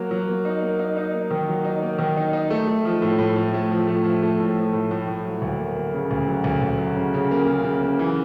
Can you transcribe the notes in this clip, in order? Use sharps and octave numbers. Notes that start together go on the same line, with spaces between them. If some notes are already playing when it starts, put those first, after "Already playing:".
Already playing: F#3 A#3
F#3
A#3
D#4
A#3
D#4
D#4
A#3
D#3
F#3
D#4
A#3
D#3
D#4
D#4
A3
A3
F3
A2
A2
A2
A3
F3
A3
F3
A3
A2
F3
A2
A2
A2
F#3
D2
A#3
A#3
C#3
D2
F#3
D2
D2
F#3
C#3
C#3
A#3
C#3
C#3
A#3
E3